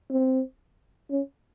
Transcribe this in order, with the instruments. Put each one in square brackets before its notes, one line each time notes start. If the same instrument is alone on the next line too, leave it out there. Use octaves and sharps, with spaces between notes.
[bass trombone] C4
C#4